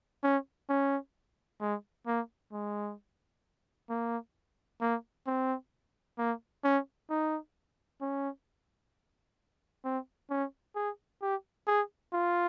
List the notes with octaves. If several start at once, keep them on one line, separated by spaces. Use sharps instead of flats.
C#4
C#4
G#3
A#3
G#3
A#3
A#3
C4
A#3
C#4
D#4
C#4
C4
C#4
G#4
G4
G#4
F4